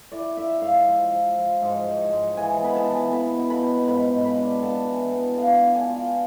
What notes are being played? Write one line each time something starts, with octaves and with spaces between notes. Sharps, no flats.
E4 D5
E4 E5
G#2 F5
F3
F3
F3
G#2
G#2
G#2
E3 G#5
B3 B5
A5
E3
B3 B5
B2
B5
B2
G#2 B5
G#2
B5
D4
B3 A5
E3
B3
D4 F5
D4
G#5
F4